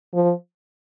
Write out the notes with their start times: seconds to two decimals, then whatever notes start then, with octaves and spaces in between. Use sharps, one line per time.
0.14 F3